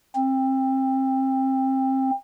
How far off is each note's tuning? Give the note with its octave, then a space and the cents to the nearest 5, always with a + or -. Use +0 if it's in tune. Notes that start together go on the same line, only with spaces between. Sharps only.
C4 +25